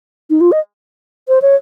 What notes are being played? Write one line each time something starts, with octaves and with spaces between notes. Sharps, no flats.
D#4
F4
D#5
C5
C#5